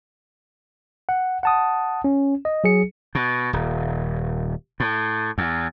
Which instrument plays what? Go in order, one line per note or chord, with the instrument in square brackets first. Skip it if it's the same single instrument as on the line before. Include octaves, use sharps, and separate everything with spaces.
[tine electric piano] F#5
F#5 A5 D#6
C#4
D#5
F#3 G#4 C#7
[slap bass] B2
D#1
A2
E2